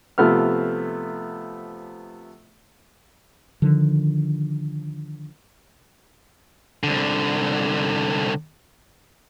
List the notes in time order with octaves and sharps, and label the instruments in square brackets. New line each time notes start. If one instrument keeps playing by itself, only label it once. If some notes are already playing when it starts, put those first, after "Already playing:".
[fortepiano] C3 F3 A3 B3 F6
[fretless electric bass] D3 D#3 F3
[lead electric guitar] C2 D3